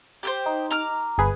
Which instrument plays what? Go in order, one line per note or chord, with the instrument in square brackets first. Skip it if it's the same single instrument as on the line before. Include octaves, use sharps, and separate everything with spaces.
[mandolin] G4 B4 C5
[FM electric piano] D#4
[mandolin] A#5 D6 F6
[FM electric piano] G1 G#4 B4